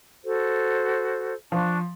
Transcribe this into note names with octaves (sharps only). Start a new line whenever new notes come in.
F#4 A4 C5
F3 D4 A5 C#6